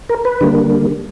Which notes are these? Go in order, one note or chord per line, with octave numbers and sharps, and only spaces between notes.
A#4
B4
D3 G3 A#3